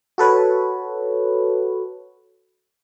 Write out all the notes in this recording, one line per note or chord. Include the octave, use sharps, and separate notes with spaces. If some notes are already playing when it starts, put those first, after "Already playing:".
F#4 A4 B4 C#5